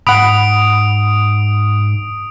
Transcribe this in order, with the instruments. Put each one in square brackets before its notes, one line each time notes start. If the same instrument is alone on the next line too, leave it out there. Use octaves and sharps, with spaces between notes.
[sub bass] G#2 [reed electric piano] F#5 B5 [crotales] D#6 D7